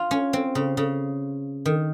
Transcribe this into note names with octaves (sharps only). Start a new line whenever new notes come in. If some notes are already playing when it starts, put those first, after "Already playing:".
Already playing: F4
C#4
C4
C#3
C#3
D#3